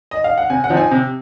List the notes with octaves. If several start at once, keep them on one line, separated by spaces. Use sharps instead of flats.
D#5
F5
F#5
C3 G#5
F#5
F3 C4 D#4
G#5
C3